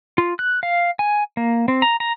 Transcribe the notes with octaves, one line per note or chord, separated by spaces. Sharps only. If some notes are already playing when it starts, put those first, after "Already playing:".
F4
F#6
F5
G#5
A#3
C4
A#5
A#5